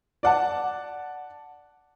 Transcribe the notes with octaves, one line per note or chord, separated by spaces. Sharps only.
D5 F#5 A5